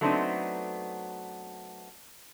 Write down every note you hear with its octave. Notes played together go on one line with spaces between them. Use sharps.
F#3 A3 B3 C4 D4 D#4